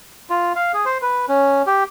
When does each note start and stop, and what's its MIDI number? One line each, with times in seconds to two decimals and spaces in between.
0.30 0.53 65
0.56 0.72 77
0.74 0.85 68
0.86 0.98 72
1.02 1.26 71
1.29 1.62 61
1.67 1.84 67